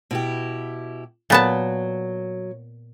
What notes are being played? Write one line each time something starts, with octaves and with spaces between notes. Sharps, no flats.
B2 E4 G4
A#2 F#3 B3 A5